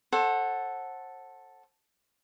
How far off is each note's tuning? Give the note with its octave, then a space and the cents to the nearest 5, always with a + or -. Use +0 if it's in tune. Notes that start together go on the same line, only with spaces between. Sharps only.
A4 +0 C5 +35 F#5 +0